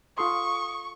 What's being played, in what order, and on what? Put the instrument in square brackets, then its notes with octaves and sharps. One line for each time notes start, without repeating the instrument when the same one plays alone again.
[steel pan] F4 A4 C6 [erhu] C#6 [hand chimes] D#6